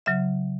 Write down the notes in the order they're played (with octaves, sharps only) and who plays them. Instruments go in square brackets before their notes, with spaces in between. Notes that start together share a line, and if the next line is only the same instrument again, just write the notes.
[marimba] C#3 F#3 E5